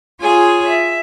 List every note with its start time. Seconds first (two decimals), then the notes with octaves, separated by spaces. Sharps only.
0.21 F4 G#4 C#5 G#5
0.67 E5